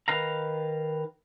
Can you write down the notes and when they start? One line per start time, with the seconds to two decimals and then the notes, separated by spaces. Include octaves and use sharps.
0.08 D#3 B4 F5 A#5